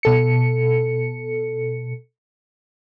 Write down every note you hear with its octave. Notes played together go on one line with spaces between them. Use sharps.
B2 A4 C#7